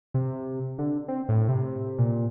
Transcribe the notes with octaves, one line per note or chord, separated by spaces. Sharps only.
C3
D3
C4
A2
C3
A#2